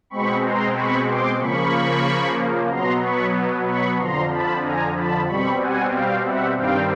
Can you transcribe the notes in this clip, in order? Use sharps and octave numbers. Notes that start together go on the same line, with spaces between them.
B2 G#3 C4 B5 C#6
A#5 C6
B5 C#6
C6 D6
C#3 F3 A#3 B5 C#6
B2 F#3 B3 A#5 C6
B5 C#6
B5 C#6
F2 D3 F3 A#5 C6
A5 B5
G#5 A#5
A5 B5
B2 G3 C4 B5 C#6
F#5 G#5
F5 G5
E5 F#5
G2 D#3 G3 C4 F5 G5